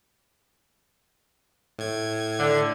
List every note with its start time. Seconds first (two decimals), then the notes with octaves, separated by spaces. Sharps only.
1.79 A2 G#6
2.38 D3